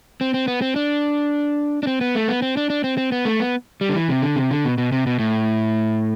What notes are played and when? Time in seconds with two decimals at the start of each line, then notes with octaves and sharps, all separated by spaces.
0.21 C4
0.34 C4
0.48 B3
0.62 C4
0.76 D4
1.83 D4
1.87 C4
2.01 B3
2.15 A3
2.28 B3
2.42 C4
2.57 D4
2.70 D4
2.84 C4
2.98 C4
3.12 B3
3.25 A3
3.40 B3
3.81 G3
3.89 D3
3.95 E3
4.09 C3
4.22 D3
4.36 C3
4.51 D3
4.65 B2
4.78 B2
4.92 C3
5.07 B2
5.19 A2